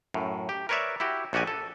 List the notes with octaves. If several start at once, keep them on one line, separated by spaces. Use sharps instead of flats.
F#2 A2
G4
A#4 B4 C#5 D5 E5
E4 F#4 G4
A#1 F#4 G4 D5 G#5
A4